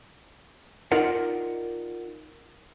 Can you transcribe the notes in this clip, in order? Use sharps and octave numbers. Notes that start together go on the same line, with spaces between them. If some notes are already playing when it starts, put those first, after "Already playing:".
D#4 F4 A#4 D5 F#5